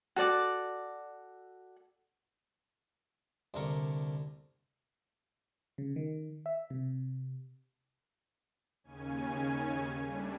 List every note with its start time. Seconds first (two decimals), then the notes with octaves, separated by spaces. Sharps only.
0.16 F#4 A4 D5 D6
3.54 C2 D3 A#4 C#6
5.78 C#3
5.96 D#3
6.46 E5
6.70 C3
8.84 D#2 C#3 C#4 G#5
10.02 G3 A3 D4